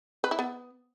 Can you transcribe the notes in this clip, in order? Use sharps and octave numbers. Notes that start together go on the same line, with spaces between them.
B4
E4
B3